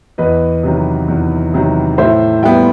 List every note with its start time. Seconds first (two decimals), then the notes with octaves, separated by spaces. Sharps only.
0.18 E2 B4 D#5
0.63 C3 D#3 F#3
1.08 E2
1.54 C3 D#3 F#3
1.98 A2 C5 E5
2.43 G3 B3 E5 G5